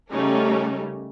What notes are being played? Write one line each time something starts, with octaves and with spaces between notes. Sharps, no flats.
C#3 G3 A3 C#4 D#4 A#4